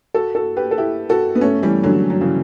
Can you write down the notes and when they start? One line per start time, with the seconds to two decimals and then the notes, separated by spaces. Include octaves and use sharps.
0.14 F#4 A4
0.35 F#4 A4
0.57 G4 B4
0.71 A4
0.78 E4 G4
1.10 F#4 A4
1.35 B3
1.41 A3 C#4
1.62 E3 G3
1.83 D3 F#3
2.10 F#3
2.21 C#3 E3